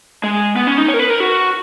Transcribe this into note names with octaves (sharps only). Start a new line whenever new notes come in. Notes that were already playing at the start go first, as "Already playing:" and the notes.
G#3
B3
C#4
D#4
C#5
A#4
B4
A#4
F#4